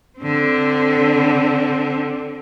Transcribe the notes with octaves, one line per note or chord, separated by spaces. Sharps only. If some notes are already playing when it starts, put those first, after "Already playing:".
D3 C4